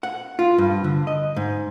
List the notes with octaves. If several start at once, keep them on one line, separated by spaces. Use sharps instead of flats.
F#5
F4
G2
D3
D#5
G#2